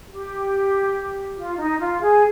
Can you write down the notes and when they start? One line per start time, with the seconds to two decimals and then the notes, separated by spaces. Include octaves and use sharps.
0.09 G4
1.36 F4
1.57 D#4
1.79 F4
2.01 G#4